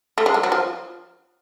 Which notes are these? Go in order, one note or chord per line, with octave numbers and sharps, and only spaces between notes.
A3
G#3
G3
F#3
F3